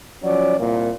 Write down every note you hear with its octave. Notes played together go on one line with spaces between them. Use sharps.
F3 F#3 C#4 D5
C2 A#2